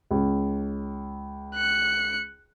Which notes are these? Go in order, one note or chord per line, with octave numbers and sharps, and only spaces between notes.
C#2
F#6 C#7